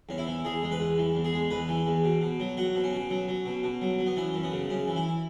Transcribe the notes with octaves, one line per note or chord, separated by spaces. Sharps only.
E2 C#4
E4
E3
E2 G#4
G#3
B4
E2
E3
E2
G#4
G#3
E2 B4
E3
E2
B2
B2
F#3
F#3 F#4
B2
C#4
B2
F#3
F#3
B2
B2
F#3
F#3
B3
E3 C#4
F#2
B3
C#3
F#2 C#4
E3
E4